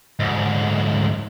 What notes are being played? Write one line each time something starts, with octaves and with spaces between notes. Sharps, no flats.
D2 G#2